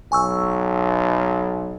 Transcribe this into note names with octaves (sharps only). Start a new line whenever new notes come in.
B1 G#5 C#6 E6